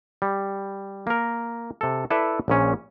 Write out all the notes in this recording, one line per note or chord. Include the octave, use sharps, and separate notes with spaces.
G3
A#3 A#4
C3 A4
E4 A4 B4 D5 E5
A#1 A#2 C#4